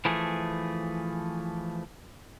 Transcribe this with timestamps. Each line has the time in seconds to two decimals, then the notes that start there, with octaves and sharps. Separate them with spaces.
0.05 E3 F3 A3 G#4